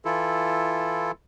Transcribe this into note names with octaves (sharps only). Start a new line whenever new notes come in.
E3 E4 F4 A4